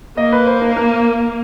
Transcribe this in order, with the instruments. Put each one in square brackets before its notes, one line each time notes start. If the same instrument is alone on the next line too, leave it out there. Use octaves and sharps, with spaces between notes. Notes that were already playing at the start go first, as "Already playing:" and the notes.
[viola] A#3 [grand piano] D#5
[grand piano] B4
C5
A#4
A#4